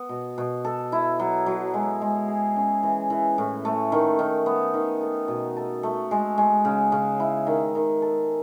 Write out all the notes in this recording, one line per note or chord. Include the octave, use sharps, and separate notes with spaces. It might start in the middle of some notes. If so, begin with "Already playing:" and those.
Already playing: B3
B2
B2
A4
E4
F#3
F#3
G#3
G#3
G#4
C#4
E3
E3
A2
A3
D#3
D#3
B3
D#3
A4
B2
A4
A3
G#3
G#3
C#3
C#3
E4
D#3
D#3
A4